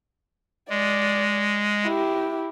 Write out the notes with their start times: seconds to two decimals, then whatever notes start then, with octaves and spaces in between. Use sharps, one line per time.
0.70 G#3 D5
1.84 E4 G4